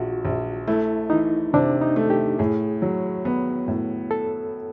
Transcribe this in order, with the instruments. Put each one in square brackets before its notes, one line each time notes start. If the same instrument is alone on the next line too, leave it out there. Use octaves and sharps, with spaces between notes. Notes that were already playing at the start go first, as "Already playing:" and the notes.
Already playing: [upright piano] A#1 [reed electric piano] F4 F#4
[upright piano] A#1
[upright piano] A3 [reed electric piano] E4
[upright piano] E3 [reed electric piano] D#4
[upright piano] C3 [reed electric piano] D4
[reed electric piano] D#4
[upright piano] A3
[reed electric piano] G4
[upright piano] A2 [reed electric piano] G#4
[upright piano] F#3
B3
A2
[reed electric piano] A4